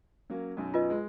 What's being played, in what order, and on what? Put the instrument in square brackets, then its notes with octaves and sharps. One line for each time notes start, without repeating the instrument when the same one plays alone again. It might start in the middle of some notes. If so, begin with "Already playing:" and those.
[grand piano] F#3 A#3 C#4
B1 F#2
[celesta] F4 B4 D#5
[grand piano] G#3